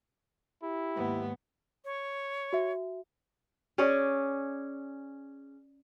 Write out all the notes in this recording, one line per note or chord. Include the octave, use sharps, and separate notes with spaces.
E4 G4
D#2 G#2 B3
C#5
F#4 E5
C#4 G#4 C#5 D5